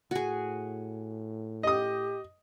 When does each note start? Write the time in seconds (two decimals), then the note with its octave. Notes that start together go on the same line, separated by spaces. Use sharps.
0.11 A2 F#4 G#4
1.63 G4 D#5 D#6